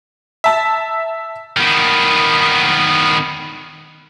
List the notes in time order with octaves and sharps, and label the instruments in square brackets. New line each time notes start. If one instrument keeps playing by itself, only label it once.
[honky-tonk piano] E5 A5
[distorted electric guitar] D#3 B3